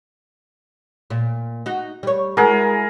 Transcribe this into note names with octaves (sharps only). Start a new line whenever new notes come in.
A#2
D#4 F#4
G3 C#5
G#3 E4 F#4 G#4 A#4